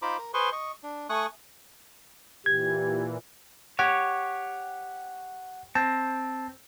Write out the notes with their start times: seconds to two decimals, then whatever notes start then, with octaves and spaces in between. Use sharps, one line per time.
0.02 D#4 F4 C5 A#5 B5 D6
0.19 A#4
0.34 G#4 B4 C5 C6 C#6
0.52 D#5 C#6
0.83 D4
1.10 A3 G#5 C#6 D#6 F#6
2.46 A#2 E3 G4 G#6
3.79 G4 C#5 F#5
5.75 C4 A5